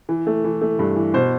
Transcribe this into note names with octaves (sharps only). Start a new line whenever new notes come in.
E3
A3
E3
A3
G2
E3
B2 C5